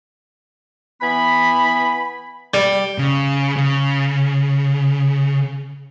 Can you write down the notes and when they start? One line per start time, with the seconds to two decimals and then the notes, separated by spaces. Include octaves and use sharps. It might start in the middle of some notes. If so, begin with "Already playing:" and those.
1.02 E3 B3 G#5 B5
2.54 G3
2.98 C#3
3.57 C#3